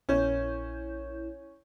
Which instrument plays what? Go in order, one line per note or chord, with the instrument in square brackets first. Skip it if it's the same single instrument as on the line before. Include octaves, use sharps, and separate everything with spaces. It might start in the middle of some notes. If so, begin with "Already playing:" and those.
[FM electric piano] A#1 E4 G6 [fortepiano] C#4